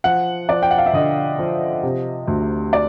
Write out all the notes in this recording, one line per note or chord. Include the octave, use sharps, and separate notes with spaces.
F3 F#5
F3 D5
G5
F#5
F5
E5
D3 D#5
F3
C3
D2
D5